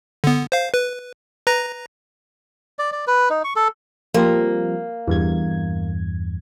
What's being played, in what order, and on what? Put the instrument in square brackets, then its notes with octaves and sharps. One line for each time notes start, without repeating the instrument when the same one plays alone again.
[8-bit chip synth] D3 B3
C5 F5
B4
B4 A#5 A#6
[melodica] D5
D5
B4
D#4
C#6
A4
[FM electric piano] F3 G3 C4 [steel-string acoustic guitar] A#3
[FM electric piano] E2 G2 G#6